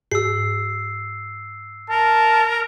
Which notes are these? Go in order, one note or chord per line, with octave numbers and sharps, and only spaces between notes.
G#2 G#4 E6 C7
A#4 A5